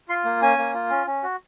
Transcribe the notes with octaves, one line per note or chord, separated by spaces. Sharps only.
F4 C6
A#3
C#4 G#5
A#3
F4
C#4
C#4
F#4